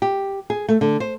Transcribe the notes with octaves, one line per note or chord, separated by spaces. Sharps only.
G4
G#4
A3
D3
C5